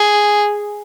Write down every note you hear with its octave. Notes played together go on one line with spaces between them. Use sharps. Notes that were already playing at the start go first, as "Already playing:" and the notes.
Already playing: G#4